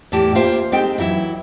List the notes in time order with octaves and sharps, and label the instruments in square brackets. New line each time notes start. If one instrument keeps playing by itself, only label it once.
[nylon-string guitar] E2 A2 E3 G4 A5
A#3 F4 G4 C5 E5 A5
G#3 C4 D#4 G4 A4 G5
E3 F#3 E4 E5